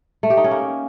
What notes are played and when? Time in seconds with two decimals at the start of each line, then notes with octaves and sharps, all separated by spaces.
0.23 A3
0.30 G4
0.37 D#4
0.44 C#4
0.51 A#3